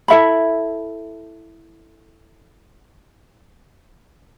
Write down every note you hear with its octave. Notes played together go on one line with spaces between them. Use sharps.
E4 A4 E5 B5